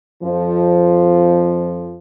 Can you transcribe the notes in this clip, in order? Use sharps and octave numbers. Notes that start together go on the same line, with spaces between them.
F2 F3